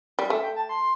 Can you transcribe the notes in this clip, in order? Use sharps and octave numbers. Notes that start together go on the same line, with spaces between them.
G3
A3 E5
G5
A5
C6